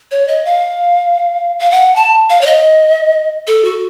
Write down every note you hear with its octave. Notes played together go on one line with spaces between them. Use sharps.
C#5
D#5
F5
F5
F#5
A5
F5
C#5
D#5
A4
F#4